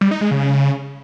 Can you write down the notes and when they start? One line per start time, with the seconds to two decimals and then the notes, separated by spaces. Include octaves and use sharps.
0.01 G3
0.11 D#4
0.21 G#3
0.31 C#3